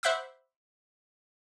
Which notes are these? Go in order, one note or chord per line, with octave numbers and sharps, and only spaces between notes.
C5 E5 F#5 B5 D6 E6